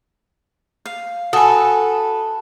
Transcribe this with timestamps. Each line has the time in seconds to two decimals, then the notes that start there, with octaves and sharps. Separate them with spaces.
0.85 F5
1.33 F#4 A4 B4 G#5 D#6